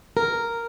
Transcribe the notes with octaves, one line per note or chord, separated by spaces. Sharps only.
A#4